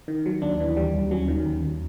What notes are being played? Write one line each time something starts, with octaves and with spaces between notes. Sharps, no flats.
D#3
F#3
D#2 D4
E3
G3
D#2
F#3 C#4
D#3
D#2
D#2